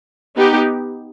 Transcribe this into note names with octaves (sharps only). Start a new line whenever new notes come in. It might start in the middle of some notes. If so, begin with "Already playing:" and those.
B3 D#4 G4